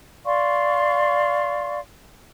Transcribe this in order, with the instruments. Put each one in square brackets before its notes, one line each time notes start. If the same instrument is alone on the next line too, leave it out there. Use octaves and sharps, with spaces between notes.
[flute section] D5 F5 C6 C#6